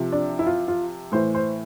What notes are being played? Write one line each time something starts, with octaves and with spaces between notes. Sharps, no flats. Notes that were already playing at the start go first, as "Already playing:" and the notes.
Already playing: C3 F3
D4
E4
F4
F4
A2 E3 C5
C5